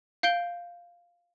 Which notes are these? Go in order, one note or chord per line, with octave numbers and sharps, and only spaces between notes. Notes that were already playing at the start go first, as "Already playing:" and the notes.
F5 G6 C7 D7 G7